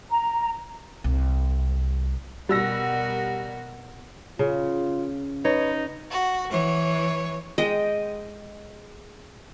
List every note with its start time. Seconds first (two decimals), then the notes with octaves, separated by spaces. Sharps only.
0.10 A#5
1.04 C2
2.49 B2 G3 F#4 A#4 E6 A#6
4.39 C#3 F4
5.45 D#4 B4 C#5
6.10 F#4
6.50 E3 C#5
7.58 G#3 D#5 G5